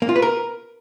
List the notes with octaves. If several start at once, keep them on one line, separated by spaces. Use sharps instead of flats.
A#3
F4
B4
A#4